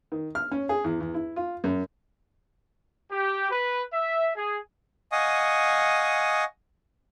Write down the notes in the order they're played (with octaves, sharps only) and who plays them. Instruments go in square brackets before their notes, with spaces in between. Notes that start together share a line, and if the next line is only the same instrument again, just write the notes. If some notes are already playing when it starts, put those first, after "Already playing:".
[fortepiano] D#3
F6
C#4
G#4
E2
E2
E4
F4
F#2
[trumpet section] G4
B4
E5
G#4
[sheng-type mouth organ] D#5 F5 F#5 G#5 C#6 D#6